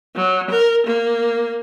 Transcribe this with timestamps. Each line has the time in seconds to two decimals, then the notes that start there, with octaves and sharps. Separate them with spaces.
0.16 F#3
0.50 A#4
0.86 A#3